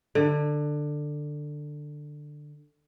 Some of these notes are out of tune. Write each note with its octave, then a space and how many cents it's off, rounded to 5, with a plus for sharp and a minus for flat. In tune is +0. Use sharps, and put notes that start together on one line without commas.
D3 +15